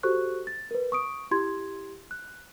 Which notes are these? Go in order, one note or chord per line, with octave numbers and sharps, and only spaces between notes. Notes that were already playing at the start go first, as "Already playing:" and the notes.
F#4 G4 A4 C5 C#6 F#6
A6
A#4 B4
C#6 D#6 D7
E4 G4 C6 G#6
F#6